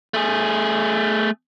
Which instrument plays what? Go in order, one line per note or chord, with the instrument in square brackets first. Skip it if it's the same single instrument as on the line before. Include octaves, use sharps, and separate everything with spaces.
[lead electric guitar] A3 G#4